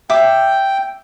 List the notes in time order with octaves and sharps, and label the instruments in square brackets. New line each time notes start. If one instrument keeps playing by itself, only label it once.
[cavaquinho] E5 D6 [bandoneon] G5